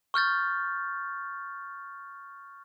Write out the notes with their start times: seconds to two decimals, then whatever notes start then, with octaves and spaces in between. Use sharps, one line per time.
0.14 C#6 F6 G6 A6